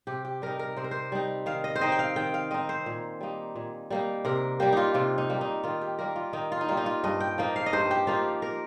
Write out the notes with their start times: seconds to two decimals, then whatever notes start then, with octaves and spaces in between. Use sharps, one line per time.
0.07 C3 G4
0.25 G4
0.42 G3 D#4 A#4
0.59 A#4
0.76 C3 C5
0.84 A#4
0.91 C5
1.12 G3 D#4
1.46 D#3 F5
1.64 D#5
1.76 C5
1.81 C4 D#4 D#5
1.92 G5
1.99 F5
2.16 D#3 G5
2.34 F5
2.51 C4 D#4 D#5
2.69 C5
2.86 A#2
3.21 G3 A#3 D#4
3.56 A#2
3.90 G3 A#3 D#4
4.25 C3 A#4
4.60 G3 A#3 G4
4.73 D#4 F4
4.94 C3 F4
5.18 D#4
5.29 G3 A#3
5.41 D#4
5.64 D#3 F4
5.81 G4
5.99 G3 A#3 A#4
6.16 F4
6.33 D#3 D#4
6.52 F4
6.61 D#4
6.68 G3 A#3 F4
6.77 D#4
6.86 F4
7.04 G2 D#5
7.20 G5
7.38 F3 A#3 D#4
7.56 F5
7.66 D#5
7.73 G2 C5
7.91 G4
8.07 F3 A#3 D#4 F4
8.42 A#4